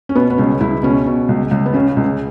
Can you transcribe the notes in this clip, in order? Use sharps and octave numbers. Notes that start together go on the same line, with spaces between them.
C#4
B2 B3
B3
C#2 C#4
C#2 E4
B2 C#4
B2
C#2
C#2
B3
C#3 C#4
C#2